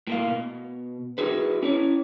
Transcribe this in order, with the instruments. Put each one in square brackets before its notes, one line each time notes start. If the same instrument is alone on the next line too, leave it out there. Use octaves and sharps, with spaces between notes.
[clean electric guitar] A2 A#3 F5
B2
D#4 E4 F#4 G#4 B4
C#4 E4 C#5